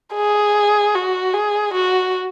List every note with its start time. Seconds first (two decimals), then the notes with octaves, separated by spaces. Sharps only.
0.15 G#4
0.95 F#4
1.34 G#4
1.74 F#4